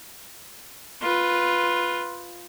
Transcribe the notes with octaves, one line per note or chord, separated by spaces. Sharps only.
F4 B4